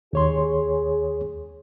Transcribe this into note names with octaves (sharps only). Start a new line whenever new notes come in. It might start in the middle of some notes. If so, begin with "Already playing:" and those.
D#2 G#4 C#5 C6